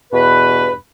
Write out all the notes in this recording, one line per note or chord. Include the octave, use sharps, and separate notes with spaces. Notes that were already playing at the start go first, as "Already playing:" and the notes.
E2 G2 B2 B4